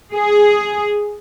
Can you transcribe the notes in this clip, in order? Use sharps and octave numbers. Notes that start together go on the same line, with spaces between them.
G#4